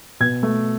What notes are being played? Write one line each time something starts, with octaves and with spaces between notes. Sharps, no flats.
B2 G#6
A3